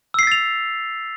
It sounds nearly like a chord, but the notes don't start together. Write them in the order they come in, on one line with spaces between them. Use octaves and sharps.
E6 C7 B6 A6 F7